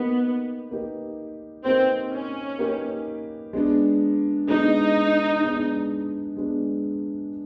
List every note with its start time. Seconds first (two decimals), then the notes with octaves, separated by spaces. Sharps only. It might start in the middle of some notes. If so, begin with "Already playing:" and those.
Already playing: A#3 B3 D#4 G4 B4
0.71 A#3 D#4 G4 B4
1.65 A#3 C4 D#4 G4 B4
2.12 C#4
2.59 A#3 D#4 G4 B4
3.53 G#3 B3 D4
4.48 G#3 B3 D4 D#4
5.43 G#3 B3 D4
6.37 G#3 B3 D4